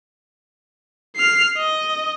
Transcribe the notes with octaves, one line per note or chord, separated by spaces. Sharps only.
F6 C7
D#5